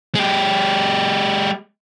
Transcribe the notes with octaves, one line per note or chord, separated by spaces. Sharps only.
G#3 G4